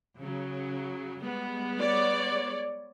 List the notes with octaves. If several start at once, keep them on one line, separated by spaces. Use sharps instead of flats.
C#3 F#3
G3 G#3 B3
C#5 D5